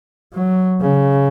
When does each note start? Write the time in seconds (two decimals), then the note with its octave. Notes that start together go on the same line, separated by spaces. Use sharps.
0.34 F#3
0.81 C#3